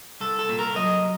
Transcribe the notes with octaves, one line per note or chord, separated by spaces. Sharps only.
C2 A4
A4
A#2
A#4
F#3 D#5